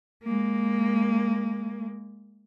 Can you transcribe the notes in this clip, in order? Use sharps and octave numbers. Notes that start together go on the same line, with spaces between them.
G#3 A#3